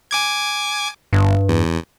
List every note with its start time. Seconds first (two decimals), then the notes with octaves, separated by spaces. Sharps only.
0.11 G#5 D6 G#6
1.13 G1 G2
1.49 E2